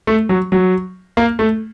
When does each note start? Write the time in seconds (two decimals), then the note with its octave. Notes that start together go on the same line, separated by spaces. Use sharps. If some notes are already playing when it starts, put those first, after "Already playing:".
0.07 A3
0.29 F#3
0.52 F#3
1.17 A#3
1.39 A3